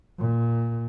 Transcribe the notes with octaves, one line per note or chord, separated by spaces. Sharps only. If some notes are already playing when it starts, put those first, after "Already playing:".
A#2